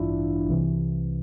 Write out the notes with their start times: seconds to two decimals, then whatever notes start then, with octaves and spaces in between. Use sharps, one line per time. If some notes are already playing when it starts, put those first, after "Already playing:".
Already playing: A1 G2 E3 D4 E4 F4
0.48 C2 C3 E3